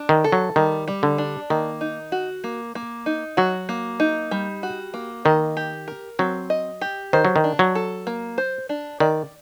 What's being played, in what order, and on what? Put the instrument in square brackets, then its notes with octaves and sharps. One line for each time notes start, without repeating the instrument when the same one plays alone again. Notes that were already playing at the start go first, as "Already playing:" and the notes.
Already playing: [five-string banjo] D4
[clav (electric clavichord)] D#3
[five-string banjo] A4
[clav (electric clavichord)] F#3
[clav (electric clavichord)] D#3 [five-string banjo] G3
[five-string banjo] G3
[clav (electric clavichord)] D3
[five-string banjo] D4
[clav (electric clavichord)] D#3 [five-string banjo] A#3
[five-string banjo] D#4
F#4
A#3
A#3
D#4
[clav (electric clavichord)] F#3 [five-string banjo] F#4
[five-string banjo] A#3
D#4
G3
F#4
A#3
[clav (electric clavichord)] D#3 [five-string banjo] D#5
[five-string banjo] G4
A#4
[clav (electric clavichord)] F#3 [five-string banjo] C4
[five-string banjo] D#5
G4
[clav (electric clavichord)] D#3 [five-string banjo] C5
[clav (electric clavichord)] F#3
D#3
[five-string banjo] D4
[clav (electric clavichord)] F#3
[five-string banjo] A4
A#3
C5
D4
[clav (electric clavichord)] D#3 [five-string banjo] D5